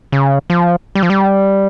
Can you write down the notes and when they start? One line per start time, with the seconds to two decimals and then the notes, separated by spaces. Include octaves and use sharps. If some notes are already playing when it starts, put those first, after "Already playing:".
0.12 C#3
0.50 F3
0.95 G3
1.03 F3
1.10 G3